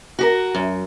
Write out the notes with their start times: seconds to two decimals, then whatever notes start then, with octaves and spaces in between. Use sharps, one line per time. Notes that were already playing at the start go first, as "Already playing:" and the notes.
0.19 F#4 G4 A#4
0.55 F#2